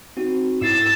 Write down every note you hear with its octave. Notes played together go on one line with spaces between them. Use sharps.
C4 D#4 F#4
G#2 E4 E6 A6 C7